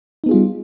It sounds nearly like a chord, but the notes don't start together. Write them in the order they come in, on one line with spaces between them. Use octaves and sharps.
D#4 B3 G#4 F4 G3